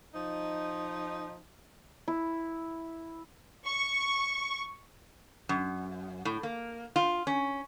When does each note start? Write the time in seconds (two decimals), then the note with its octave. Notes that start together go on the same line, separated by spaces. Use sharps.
0.14 F3 D#4
2.08 E4
3.66 C#6
5.49 F#2
6.25 A2
6.43 A#3
6.96 F4
7.27 C#4